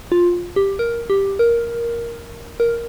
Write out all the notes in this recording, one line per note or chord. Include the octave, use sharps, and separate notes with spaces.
F4
G4
A#4
G4
A#4
A#4